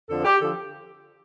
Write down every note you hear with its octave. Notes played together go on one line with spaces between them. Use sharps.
F2 D3 F3 A4
G4
D3 F3 A4